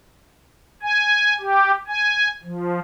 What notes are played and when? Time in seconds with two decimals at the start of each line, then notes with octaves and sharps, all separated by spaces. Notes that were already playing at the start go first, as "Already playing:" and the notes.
0.83 G#5
1.40 G4
1.88 G#5
2.43 F3